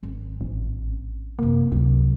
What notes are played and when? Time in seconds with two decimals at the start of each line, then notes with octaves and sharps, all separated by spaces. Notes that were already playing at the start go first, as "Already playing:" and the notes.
0.03 G#1 C#4
0.41 A1
1.39 F#2 C3 A#3
1.72 C#2 C3 F#3